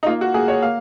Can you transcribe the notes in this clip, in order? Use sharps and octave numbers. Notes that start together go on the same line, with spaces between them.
D#4
A#3 F4
F#4
A#3 G#4
C#5
A#3 F5